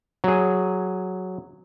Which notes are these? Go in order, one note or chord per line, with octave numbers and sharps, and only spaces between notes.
F#3 G#4